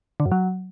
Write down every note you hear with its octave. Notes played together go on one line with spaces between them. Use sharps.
D3
F#2
F#3